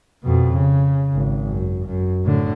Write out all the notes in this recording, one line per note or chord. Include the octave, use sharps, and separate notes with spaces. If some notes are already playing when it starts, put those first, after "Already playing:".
F2 B2
C#3
G#1
F#2
F#2
A2 D3